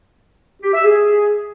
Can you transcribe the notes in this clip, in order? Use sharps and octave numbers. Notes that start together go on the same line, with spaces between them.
G4
E5
G#4